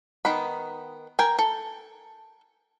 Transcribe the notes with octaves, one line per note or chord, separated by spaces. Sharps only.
D#3 B3 B5
A#4 G5 G#5
A4